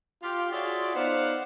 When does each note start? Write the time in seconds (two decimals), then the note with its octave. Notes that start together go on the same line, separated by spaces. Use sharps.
0.23 F4 G4
0.52 F4 F#4 G#4 C#5 D5 E5
0.95 B3 D#4 C5 D5 F5 F#5